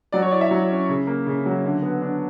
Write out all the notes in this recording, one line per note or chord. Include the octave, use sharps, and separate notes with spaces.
F#3 D5
C#5
E4 D5
E5
F#3
C#4
C#3
A#3
C#3
F#3
D3
B3
D4